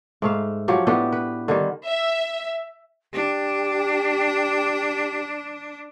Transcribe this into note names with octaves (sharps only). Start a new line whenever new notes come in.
G#2 A3 F5
F3 F#3 G4
A2 B3 D4 G4
B4
D3 D#3 G3
E5
D4 G4